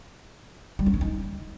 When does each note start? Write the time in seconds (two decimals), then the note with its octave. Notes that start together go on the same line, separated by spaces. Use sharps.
0.79 G3
0.86 C#4
0.94 G#3
1.01 D#4